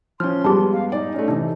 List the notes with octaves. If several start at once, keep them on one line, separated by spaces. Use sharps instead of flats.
F3 C#4 C6 F6
G2 G#3 B3 G4 A5
F5
D#4 D5
A3 C#4
C3 E3 D4